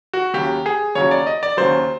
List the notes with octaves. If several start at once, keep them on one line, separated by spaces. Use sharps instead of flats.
F#4
D#2 C#3 F#3 G4
G#4
D#2 C#3 F#3 C#5
D5
D#5
D5
D#2 C#3 F#3 C5